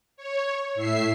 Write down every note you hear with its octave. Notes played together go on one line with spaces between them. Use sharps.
C#5
A2 E5 C7